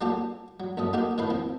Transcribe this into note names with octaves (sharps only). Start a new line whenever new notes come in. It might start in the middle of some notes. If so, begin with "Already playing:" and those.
F#3 A#3 D4 F4 G4 A4
F#3
A#1 F#2 A4 D#6
A#3 D#4 F#4 G4 A4 A#4
A2 D#3 A4 B4 F5 B5
F3 C4